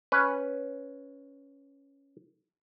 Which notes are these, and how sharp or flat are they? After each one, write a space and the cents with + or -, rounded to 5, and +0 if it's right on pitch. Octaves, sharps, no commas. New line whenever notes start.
C#4 +0 B4 +0